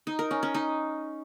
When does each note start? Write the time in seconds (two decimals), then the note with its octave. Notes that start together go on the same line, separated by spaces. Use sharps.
0.07 D#4
0.19 A#4
0.31 C#4
0.43 C#4
0.55 D#4